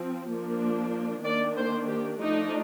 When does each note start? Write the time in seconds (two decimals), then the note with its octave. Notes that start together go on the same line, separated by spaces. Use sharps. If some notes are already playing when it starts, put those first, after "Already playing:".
Already playing: F3 C4
0.31 F3 A#3 D4
1.25 D#3 A#3 D4 D5
1.56 C5
1.88 G4
2.20 F3 A3 D4 D#4